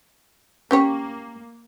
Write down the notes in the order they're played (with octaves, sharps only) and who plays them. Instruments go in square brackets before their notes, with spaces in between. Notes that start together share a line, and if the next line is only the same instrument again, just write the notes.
[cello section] A#3 [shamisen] C#4 G4 C#5